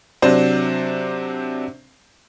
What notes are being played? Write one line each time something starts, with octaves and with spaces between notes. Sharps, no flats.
C3 F#3 D4 C5